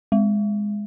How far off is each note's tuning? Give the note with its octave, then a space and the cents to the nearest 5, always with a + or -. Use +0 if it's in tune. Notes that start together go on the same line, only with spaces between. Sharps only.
G#3 -5